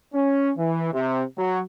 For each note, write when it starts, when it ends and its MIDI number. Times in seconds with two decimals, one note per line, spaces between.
0.13 0.52 61
0.58 0.90 52
0.93 1.22 48
1.37 1.60 54